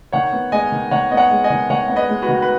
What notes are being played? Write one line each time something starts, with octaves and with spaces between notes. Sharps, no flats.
D#3 C#5 F#5
B3
G#3 D#5 G#5
D#3
D#3 C#5 F#5
B3 D#5
C#5 F#5
G#3
D#5 G#5
D#3
D#3 C#5 F#5
B3 F#5
B4 D#5
G#3
F#4 B4
D#3
B4